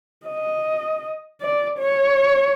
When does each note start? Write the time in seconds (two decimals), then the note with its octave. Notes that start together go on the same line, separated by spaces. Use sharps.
0.26 D#5
1.41 D5
1.79 C#5